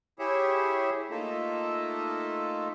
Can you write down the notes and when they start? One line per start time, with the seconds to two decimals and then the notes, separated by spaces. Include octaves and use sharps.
0.19 E4 G4 G#4 C#5 E5
1.11 A3 A#3 D#4 F4 A4 E5